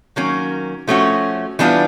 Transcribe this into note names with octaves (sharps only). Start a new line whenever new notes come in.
D#3 F#3 A#3 C#4
F3 A3 C#4 F#4
E3 G3 B3 D4 F4